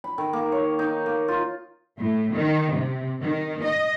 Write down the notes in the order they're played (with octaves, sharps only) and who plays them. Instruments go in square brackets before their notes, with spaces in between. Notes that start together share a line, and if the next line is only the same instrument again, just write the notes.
[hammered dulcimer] B5
D#3
A#3
C#5
D#4
A#3
F4
[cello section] A2
D#3
C3
D#3
D#5